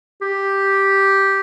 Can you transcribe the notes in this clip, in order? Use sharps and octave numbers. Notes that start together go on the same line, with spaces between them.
G4